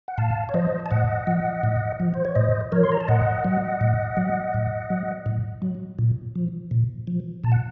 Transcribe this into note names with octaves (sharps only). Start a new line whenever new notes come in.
F#5
A2 F5 A5
C#5
F3 C5 D#5
A5
A2 D#5 F#5
F3
A2
F3
C5
C#5
A2 C5 D#5
F3 A#4 C#5
C6
A#5
A5
A2 D#5 F#5
F#3
A2
F#3
A2
F#3
A2
F#3
A#2
F3
A#2
F3
A#2 A5
F#5